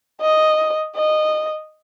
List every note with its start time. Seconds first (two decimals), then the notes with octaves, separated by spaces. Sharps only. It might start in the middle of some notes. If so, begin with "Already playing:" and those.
0.22 D#5
0.96 D#5